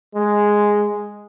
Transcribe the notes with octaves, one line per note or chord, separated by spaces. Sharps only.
G#3